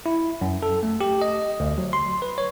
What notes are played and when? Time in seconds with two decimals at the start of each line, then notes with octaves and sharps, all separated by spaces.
0.06 E4
0.41 F#2
0.63 A4
0.83 A3
1.01 G4
1.22 D#5
1.60 D2
1.78 F#3
1.93 C6
2.22 B4
2.38 C#5